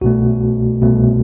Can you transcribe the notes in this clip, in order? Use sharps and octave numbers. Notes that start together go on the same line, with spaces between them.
C2 B2 A3 F#4
C2 B2 A3